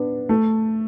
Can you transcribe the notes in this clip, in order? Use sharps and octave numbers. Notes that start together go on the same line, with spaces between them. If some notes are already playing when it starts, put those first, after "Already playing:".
Already playing: B3 D4
A3